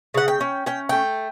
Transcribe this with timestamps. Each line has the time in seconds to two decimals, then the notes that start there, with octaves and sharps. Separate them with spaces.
0.14 C#3 F#5
0.28 G5
0.41 C#4
0.66 C#4 G5
0.89 A3 G5